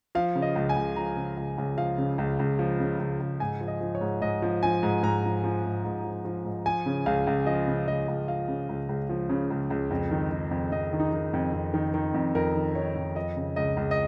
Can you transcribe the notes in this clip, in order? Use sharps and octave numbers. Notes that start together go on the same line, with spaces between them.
F3 F5
C#3
D#5
C#2
G#5
C#2
F3 A#5
C#3
C#2
C#2
F3 F5
C#3
C#2
C#2
F3
C#3
C#2
C#2
G#2 G#5
F3
D#5
F3
C#5
G#2
G#2 D#5
F3
F3 G#5
G#2
G#2 A#5
F3
F3
G#2
G#2
F3
F3
G#2
F3 G#5
C#3
C#2 F5
C#2
F3 D#5
C#3
C#2 D#5
C#2
F3 F5
C#3
C#2
C#2
F3
C#3
C#2
C#2
F2
D#3
D#3
F2
F2 D#5
D#3
D#4
D#3
F2
F2
D#3
D#3
F2
F2 A#4
D#3
D#3 C#5
F2
F3 D#5
C#3
C#2 D#5
C#2
D#5